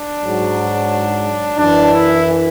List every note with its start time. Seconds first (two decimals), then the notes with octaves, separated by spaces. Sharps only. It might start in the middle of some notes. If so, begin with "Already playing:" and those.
Already playing: D4
0.23 G#2 F#3
1.59 F#2 E3 D4
1.93 E4